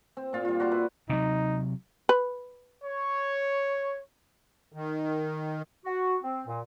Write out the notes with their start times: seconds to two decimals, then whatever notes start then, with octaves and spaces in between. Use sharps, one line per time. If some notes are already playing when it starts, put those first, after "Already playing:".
0.17 C4
0.33 A#2 F4
0.45 G3 F4
0.60 F#4 D5 C6
0.71 E4 B4
1.10 C3 F#3 D#4
2.09 B4
2.83 C#5
4.73 D#3
5.85 F#4
6.23 C4
6.47 A#2